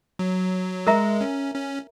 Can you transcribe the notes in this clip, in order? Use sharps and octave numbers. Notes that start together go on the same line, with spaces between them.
F#3
G#3 A#4 E5 A#5
C#4
C#4